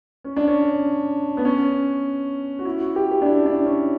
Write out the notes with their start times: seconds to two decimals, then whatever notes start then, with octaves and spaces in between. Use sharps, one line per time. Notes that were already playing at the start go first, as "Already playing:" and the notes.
0.24 C#4
0.36 D4
0.48 C#4
1.37 B3
1.45 C#4
2.59 F#4
2.65 E4
2.81 F#4
2.96 G4
3.11 G4
3.22 D4
3.26 E4
3.46 D4
3.66 C#4